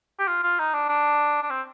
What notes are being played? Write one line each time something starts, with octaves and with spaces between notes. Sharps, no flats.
G4
F4
F4
D#4
D4
D4
D4
C4